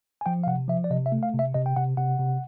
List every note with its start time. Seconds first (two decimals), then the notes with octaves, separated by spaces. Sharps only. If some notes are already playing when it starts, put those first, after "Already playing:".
0.21 G#5
0.26 F3 G5
0.44 F5
0.47 C3 F#5
0.68 F3 E5
0.84 D5
0.90 C3 D#5
1.06 E5
1.12 A3
1.23 F5
1.34 C3
1.39 E5
1.54 C3 D#5
1.66 G5
1.76 C3 F#5
1.97 C3 F#5
2.19 C3